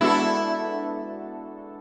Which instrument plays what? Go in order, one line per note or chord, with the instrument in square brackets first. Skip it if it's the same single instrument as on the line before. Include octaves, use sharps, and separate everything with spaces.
[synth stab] G#3 B3 D4 F#4 A4 [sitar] E4